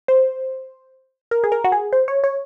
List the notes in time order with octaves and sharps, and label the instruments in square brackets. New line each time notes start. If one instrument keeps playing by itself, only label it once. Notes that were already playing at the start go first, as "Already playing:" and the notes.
[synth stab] C5
A#4
G#4
A#4
F#4
G#4
C5
C#5
C#5